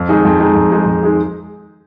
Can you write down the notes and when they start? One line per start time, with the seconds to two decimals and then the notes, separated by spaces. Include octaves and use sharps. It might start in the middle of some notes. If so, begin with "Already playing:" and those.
Already playing: F2
0.09 D#3 G#3 D#4 G#4
0.25 F2
0.40 D#3 G#3 D#4 G#4
0.55 F2
0.72 D#3 G#3 D#4 G#4
0.86 F2
1.03 D#3 G#3 D#4 G#4